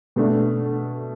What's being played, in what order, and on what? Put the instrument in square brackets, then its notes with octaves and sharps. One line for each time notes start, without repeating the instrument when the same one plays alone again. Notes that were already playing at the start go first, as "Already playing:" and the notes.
[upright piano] B2 A3 D4